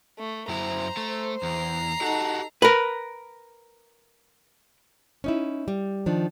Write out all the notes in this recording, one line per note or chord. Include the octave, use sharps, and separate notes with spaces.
A3
F#2 E4 C5 A#5
A3
E2 A#5 C7
D#4 F#4 G4 A4 F#5
A#4 B4
C#4 D#4 E4
G3
D#3 F3 D4